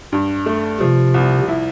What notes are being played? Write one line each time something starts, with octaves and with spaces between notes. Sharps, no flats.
G2
A3
C3 F3
C2
E4